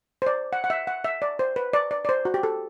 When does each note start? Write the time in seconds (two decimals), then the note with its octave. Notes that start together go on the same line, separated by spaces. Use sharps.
0.22 C5
0.27 D5
0.53 F#5
0.64 F#5
0.70 E5
0.87 F#5
1.04 E5
1.22 D5
1.39 C5
1.56 B4
1.73 D5
1.91 D5
2.05 D5
2.09 C5
2.25 F#4
2.34 G4
2.43 A4